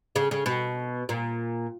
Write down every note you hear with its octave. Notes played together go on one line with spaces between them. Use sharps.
C#3
C#3
B2
A#2